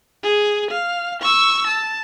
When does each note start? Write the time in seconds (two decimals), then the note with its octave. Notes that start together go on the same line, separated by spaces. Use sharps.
0.23 G#4
0.71 F5
1.22 C#6 E6
1.67 A5